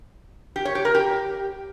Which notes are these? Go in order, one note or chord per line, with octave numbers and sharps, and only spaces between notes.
G4
C#5
G4
A#4
G4